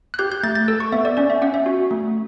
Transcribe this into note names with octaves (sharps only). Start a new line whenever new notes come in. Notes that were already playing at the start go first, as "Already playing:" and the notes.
F#6
G4 G6
G6
A3 A6
A6
A4 E6
C#6
B3 E5
D5
C#4 D5
E5
C#4 F#5
E5
F#4
A3